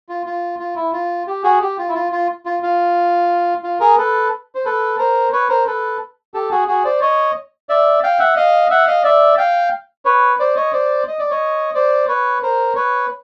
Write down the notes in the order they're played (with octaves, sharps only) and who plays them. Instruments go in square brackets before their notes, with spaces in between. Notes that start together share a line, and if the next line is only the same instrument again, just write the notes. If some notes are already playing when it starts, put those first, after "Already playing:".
[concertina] F4
F4
F4
E4
F4
G4
F#4 G#4
G4
F4
E4
F4
F4
F4
F4
F4
G#4 A#4
A4 B4
C5
A4 B4
A#4 C5
B4 C#5
A#4 C5
A4 B4
G4 A4
F#4 G#4
F#4 G#4
C5 D5
C#5 D#5
D5 E5
F5 G5
E5 F#5
D#5 F5
E5 F#5
D#5 F5
D5 E5
F5 G5
B4 C#5
C5 D5
C#5 D#5
C5 D5
D#5
D5
C#5 D#5
C5 D5
B4 C#5
A#4 C5
B4 C#5